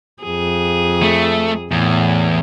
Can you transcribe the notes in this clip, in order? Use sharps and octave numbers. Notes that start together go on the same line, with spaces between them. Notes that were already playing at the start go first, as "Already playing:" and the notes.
F2 G#4
A3
E2 A2